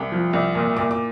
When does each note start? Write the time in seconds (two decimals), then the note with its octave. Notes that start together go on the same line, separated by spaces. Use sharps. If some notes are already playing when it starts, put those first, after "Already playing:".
Already playing: C2 D6
0.12 F3
0.33 C2
0.55 A#2
0.77 A#2 D6
0.91 D6